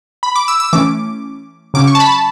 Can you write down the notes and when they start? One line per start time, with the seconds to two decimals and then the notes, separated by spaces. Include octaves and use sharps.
0.23 B5
0.36 D6
0.48 E6
0.60 E6
0.73 E3 A3 C#4 D6
1.74 C#3 F#3 C#4 D6
1.87 C#6
1.95 A5
2.00 B5
2.12 A5